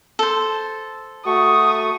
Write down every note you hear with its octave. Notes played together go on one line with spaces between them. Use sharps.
A4 C5
A3 F#4 C#6 D#6